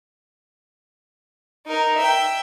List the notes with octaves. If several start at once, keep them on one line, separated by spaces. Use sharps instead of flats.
D#4 A#4
E5 G5